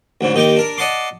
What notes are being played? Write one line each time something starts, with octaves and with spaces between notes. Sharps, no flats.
D2 G#2 C#3
D#2 D#4 G4 G5 D6
D4 A#4
D5 D#5 F#5 A5 C6 D6